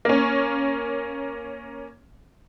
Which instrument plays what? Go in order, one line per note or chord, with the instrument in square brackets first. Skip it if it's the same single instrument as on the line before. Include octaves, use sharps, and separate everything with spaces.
[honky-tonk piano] A#3 C#4